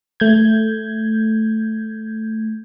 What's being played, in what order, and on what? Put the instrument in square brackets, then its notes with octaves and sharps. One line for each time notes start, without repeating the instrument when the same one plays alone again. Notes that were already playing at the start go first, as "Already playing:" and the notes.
[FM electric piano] A3 G6 G#6